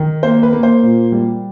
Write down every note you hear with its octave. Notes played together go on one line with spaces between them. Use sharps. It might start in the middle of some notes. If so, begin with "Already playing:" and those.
Already playing: D#3
A#3 C5
B4
A#3
C5
A#2
G3